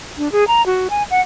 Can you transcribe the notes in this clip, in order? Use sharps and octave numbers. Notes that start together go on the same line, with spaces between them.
D4
G#4
A#5
F#4
G#5
F#5